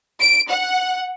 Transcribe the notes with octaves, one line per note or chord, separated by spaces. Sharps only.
D7
F#5